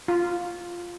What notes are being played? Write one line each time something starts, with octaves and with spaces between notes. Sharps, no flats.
F4